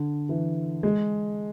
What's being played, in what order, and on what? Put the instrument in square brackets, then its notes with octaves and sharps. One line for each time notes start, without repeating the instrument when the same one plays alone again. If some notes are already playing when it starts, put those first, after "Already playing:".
Already playing: [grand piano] D3
E3
G#3